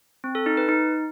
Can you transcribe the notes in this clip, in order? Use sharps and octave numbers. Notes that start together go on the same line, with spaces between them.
C4
A4
D#4
B4
D#4